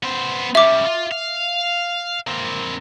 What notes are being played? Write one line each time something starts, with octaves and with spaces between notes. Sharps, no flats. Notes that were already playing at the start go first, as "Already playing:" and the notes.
B3 C5
G3 C#4 E5 D6
F4
F5
A#3 C4